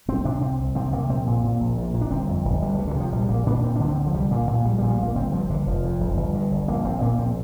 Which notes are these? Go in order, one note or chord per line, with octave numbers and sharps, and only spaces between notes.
C2 C4
C3 D4
C3 C4
C2
C3 C4
C3 A#3
A#1 C4
A#2
A#2
A#1
A#2
A#2
D4
G1 C4
F2
G1
D2 G3
G3
C3
D3
C3 F3
A#1 G3
A#2 A#3
A#2 D4
D2 C4
D4
D3
C4
D3
F3
C2 G3
A#2 A#3
A#2
A#1 G3
G3
A#2
G3
A#2 A#3
G1 C4
G2 F3
G1 D3
F1 F3
F2
F1
G1
G2
G1
A#1 A#3
A#2 C4
A#2 A#3
A#1 C4